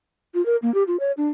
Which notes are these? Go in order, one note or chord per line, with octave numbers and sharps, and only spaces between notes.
F4
A#4
A#3
G4
F4
C#5
D4